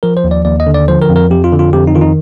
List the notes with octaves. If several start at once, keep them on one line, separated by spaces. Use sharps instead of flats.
F3 A#4
C5
D#2
D5
D#2 D5
D#5
D3
D5
F3 C5
A#4
F2
A#4
F2 G4
F4
D3
F4
F2 G4
D#4
D#3 F4
D#4